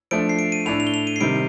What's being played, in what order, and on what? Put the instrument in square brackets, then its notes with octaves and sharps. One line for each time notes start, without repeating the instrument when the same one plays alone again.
[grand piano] F3 A3 D4 [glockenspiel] D7
[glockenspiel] C7
D7
D#7
[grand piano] A2 A3 D4 [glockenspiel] F7
[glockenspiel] F7
G7
F7
D#7
C7
[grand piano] C3 D#3 G3 [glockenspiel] D7